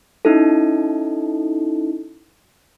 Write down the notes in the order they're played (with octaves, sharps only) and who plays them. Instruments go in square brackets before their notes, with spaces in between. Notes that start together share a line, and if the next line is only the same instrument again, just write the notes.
[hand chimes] C#4 D#4 E4 A4